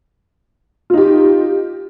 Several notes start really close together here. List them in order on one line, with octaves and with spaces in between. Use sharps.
F4 D#4 G4